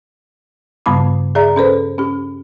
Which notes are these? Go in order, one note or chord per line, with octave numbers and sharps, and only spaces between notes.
G2 C#3 G3 B3 B5 D6
G#4 D5 E5 A#5
C#4 A4 B4 C5
C#4 G4